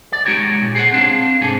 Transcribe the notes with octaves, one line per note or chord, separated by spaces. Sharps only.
D5
G#3 D#4 F#4 G4 C#5
A#2
G#4 A4 C5 C#5 F#5
C4 D4 F5
G#2 C3 C#4 G#4 A4